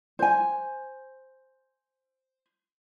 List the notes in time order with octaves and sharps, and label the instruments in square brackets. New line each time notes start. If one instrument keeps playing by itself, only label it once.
[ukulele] C5 G#5